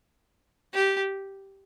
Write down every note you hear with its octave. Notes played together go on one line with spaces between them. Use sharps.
G4